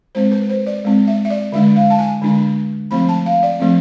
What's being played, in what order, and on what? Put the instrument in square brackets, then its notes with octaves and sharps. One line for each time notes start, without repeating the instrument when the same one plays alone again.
[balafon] G#3 C4 C5
B4
C5
D5
G#3 C4
E5
E5
D5
D3 G#3 D4 E5
F5
A5
G#5
D3 G#3 D4
F3 A3 C4 B5
A5
F5
D5
F3 A3 C4